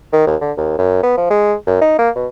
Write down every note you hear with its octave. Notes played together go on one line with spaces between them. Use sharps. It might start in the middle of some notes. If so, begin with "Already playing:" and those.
D#3
D#2
D3
D#2
F#2
B3
F3
G#3
F#2
D#4
A#3
B2